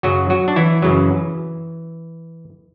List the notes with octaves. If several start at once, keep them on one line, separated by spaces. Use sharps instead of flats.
F#2 C#3 F#3 F#4
F#3 F#4
D4
E3 E4
F#2 C#3 F#3